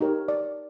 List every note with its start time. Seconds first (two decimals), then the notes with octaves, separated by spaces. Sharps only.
0.01 D#4 G4 A#4 C#5
0.28 D5